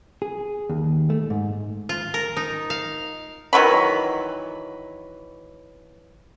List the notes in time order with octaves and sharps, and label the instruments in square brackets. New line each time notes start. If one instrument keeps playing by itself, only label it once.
[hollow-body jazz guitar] G#4
D#2
A3
G#2
[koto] F4
A#4
D#4
F5
[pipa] D#3 E3 F#3 B5